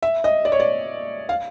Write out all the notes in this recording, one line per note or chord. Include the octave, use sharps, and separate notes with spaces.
E5
D#5
D5
C#5
D5
F5